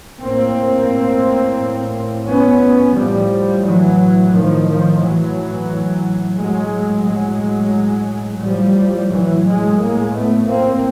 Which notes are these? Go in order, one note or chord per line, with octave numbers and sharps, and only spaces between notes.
A2 A#3 C4
B3 C#4
A2 F3 G3
E3 F#3
D#3 F3
D#3 F3
E3 F#3
A2
F#3 G#3
F#3 G#3
A2 F3 G3
E3 F#3
F#3 G#3
G#3 A#3
A3 B3
A#3 C4